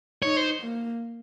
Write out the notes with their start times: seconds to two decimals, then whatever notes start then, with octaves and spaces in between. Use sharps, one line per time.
0.22 D#4 C#5
0.37 C5
0.62 A#3